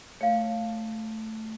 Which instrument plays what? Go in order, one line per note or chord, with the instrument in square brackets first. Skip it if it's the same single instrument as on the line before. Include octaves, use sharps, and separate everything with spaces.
[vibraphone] A3 [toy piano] C#5 F5